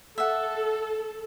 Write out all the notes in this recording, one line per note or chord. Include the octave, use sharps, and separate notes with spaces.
A4 E5 F#5